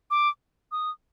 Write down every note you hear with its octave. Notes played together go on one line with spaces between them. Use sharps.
D6
D#6